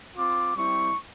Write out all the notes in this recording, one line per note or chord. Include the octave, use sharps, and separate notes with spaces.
C4 F4 D6
G3 C4 E4 C#6